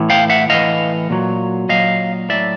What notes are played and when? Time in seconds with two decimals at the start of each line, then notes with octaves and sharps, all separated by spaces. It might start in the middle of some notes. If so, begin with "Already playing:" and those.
Already playing: A2 E3
0.10 F5 G5
0.30 E5 F#5
0.49 A2 E3 D#5 F5
1.10 A#2 F#3
1.69 A#2 F#3 D#5 F5
2.29 A2 F#3 D5 E5